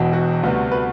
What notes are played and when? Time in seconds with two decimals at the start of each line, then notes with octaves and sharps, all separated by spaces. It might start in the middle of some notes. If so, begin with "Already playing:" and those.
Already playing: E1 E2 B2
0.13 F#4
0.43 D2 C3 G3 B3
0.72 B4